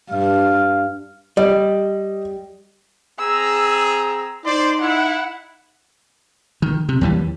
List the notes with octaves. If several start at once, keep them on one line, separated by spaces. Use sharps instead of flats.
G2 F5
G3 D#5
C4 G#4 A#5 E6
D#4 C5 D5 C6
E4 F#5
D#3
C3
D#2 E3 G3